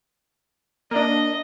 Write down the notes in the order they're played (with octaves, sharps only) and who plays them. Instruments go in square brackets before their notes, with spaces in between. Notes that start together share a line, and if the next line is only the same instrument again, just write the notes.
[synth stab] A#3 D4 [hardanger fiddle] D#5